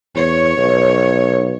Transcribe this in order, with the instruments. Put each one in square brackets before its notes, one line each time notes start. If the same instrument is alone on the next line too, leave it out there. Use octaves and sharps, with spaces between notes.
[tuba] E2 [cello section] C#5
[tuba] B1